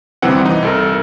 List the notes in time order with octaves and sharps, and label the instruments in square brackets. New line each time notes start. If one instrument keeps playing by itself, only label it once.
[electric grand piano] D#2 C3 E3 G3 C4 F#5
E3 D#4
C2 A4 A#4